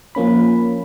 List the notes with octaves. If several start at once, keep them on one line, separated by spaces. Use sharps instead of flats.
F3 A#3 C#4 B5